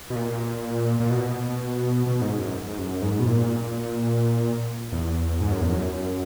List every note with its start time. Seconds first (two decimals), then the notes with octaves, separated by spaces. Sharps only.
0.10 B2
0.15 A#2
1.00 A#2
1.10 B2
2.07 B2
2.22 G#2
2.38 F#2
2.69 G#2
2.79 F#2
3.02 G#2
3.20 B2
3.26 A#2
4.92 E2
5.41 G#2
5.51 F#2
5.61 E2
5.72 F#2